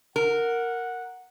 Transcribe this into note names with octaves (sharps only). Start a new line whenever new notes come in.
A#4 F#5